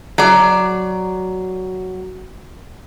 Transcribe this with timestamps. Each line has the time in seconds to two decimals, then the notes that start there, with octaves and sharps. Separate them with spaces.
0.18 F#3 D5